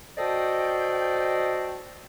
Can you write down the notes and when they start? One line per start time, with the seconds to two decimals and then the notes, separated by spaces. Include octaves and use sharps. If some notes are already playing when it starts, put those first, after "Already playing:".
0.18 F#4 A4 C5 D5 D#5 G5